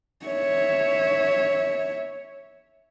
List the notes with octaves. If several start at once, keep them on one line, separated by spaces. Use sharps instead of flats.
C#5 E5